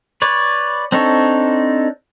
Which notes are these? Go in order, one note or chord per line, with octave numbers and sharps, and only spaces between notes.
B4 C#5 D5
C4 D4 D#4 A4 C#5